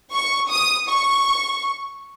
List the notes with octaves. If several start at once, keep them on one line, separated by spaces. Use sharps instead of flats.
C#6
D#6
C#6